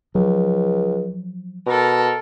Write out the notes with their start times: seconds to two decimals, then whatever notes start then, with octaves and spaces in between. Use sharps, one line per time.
0.15 C#2 F3 F#3
1.66 B2 A4 A#4